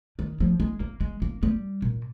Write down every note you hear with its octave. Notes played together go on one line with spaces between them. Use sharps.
D#3
F3
G#3
A#3
G#3
A#3
G3
A#2